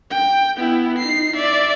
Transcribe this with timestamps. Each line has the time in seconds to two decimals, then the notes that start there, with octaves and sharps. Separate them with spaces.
0.11 G5
0.56 B3 E4
0.98 D#4 C7
1.36 D5 E5